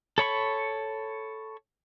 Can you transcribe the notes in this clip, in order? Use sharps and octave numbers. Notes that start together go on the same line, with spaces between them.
A4 C#5 B5 C#6